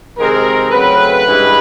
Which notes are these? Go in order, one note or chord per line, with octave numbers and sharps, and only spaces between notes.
C3 D#3 G#3 C4 A#4
C#3 F#3 A3 C4 B4
G2 E3 G#3